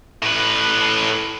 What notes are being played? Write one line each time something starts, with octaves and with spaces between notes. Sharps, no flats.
A2 B4